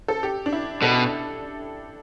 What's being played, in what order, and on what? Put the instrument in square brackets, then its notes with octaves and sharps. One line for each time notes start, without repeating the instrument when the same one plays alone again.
[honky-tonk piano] A4
G4
D4
E4
[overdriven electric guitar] B2 [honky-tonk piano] A4